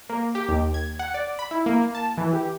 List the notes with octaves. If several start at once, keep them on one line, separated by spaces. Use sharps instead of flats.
A#3
G4
D#2
G#6
F#5
D5
B5
E4
A#3
A5
E3
G4